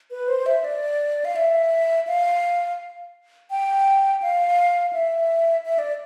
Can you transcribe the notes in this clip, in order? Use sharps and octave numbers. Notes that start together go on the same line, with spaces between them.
B4
C5
E5
D5
F5
E5
F5
G5
F5
E5
E5
D5